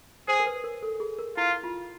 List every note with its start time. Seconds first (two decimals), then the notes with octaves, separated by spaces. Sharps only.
0.28 G#4 C5
0.40 A#4
0.47 B4
0.64 A#4
0.83 A4
1.00 G#4
1.19 A#4
1.37 E4 F4
1.64 F4